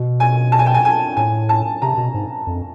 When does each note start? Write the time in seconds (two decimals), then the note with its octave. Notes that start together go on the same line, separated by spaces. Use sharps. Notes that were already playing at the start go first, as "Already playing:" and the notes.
Already playing: B2
0.20 G#5
0.52 A5
0.59 G#5
0.66 G5
0.74 G#5
0.85 G#5
1.17 A2 G#5
1.49 A5
1.82 C3 A#5
1.97 B2
2.14 G#2
2.47 F2